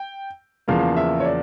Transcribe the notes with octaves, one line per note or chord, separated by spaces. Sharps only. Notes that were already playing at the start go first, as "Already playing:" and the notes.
Already playing: G5
E2 C#3 F3 A#3 F5
E5
C#5
D5